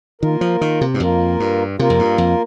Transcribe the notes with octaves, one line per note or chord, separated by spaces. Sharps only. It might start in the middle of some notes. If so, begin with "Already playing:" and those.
D#3 A#3 F4 A#4
F3
D#3
C3
G2
F2 A#3 F4 A#4
G2
C3 A#3 F4 A#4
F2
G2
F2